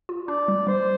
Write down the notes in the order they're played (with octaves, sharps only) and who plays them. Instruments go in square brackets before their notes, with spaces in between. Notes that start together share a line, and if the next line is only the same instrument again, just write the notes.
[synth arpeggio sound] F4
[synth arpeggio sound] D4 [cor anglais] D5
[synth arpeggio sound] G3
[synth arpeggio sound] G3 [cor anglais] C5